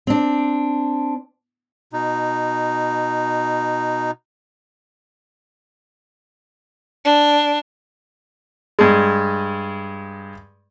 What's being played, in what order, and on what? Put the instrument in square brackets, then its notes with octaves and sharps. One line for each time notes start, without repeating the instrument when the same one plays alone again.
[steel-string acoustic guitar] C4 D4
[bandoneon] B2 D#4
[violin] D4
[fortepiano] G2 G#3